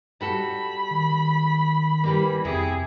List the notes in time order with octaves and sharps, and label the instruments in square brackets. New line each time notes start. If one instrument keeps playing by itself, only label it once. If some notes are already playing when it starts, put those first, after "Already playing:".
[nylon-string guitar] G3 F#4 A4 [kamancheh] B5
[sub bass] D#3
[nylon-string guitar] E3 G3 A#3
[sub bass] F2 [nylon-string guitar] C3 [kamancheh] E4 G#4